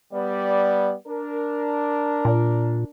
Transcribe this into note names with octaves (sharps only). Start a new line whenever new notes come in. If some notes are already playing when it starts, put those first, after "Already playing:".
G3 B3 D5
D4 A#4
A#2